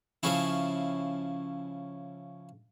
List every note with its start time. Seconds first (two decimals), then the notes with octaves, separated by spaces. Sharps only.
0.23 C#3 F3 C#4 E4